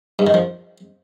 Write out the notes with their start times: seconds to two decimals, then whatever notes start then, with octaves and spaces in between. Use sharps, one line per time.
0.19 G2
0.27 D#3
0.34 F3